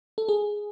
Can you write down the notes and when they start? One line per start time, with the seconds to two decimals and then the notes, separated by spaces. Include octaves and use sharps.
0.18 A4
0.29 G#4